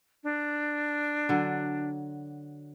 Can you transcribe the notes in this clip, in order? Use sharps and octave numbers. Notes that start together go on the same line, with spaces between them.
D4
D3 F#3